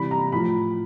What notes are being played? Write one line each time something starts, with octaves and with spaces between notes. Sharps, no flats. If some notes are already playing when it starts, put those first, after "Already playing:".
Already playing: C3 E3 G3 B5
A#5
A2 F3 B5